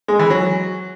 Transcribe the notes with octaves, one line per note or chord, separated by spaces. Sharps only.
G#3
E3
F#3